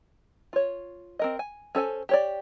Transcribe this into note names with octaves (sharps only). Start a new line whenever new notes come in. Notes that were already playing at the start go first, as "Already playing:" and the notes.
F4 C#5
C4 A#4 D#5
G#5
C#4 A4 C5 G#5
G4 C#5 D5